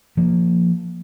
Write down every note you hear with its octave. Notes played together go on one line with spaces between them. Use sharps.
F3 A#3